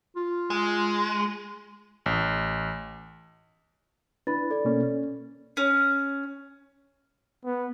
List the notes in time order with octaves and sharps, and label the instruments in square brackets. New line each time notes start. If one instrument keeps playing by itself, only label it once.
[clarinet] F4
[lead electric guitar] G#3
[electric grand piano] A1
[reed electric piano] D4 E4 B4 [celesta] B5 A6
[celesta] A4 D5
[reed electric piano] B2 A#3 C#4
C#4
[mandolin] C#4
[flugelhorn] B3